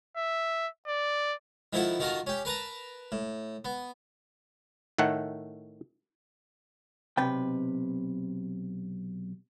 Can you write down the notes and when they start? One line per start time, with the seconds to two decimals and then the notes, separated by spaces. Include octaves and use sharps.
0.17 E5
0.87 D5
1.73 D#3 F3 E4 A4 F#5
1.99 D#3 F4 F#4 A4 A#4
2.27 C#4 G4
2.45 A#4 B4 A5 A#5
3.12 A2
3.65 B3
4.98 A2 D#3 A3 F#5
7.17 B1 C3 B4 G5